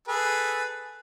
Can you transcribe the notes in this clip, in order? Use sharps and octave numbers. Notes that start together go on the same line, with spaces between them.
G#4 A4 B4